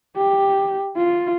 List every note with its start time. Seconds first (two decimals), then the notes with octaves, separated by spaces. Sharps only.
0.17 G4
0.97 F4